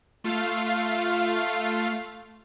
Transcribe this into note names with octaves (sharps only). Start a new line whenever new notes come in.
A3 F4 F5